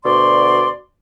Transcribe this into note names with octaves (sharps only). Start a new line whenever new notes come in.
D2 B2 D5 C6